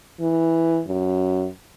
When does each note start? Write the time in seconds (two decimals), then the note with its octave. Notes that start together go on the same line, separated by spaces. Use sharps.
0.20 E3
0.87 F#2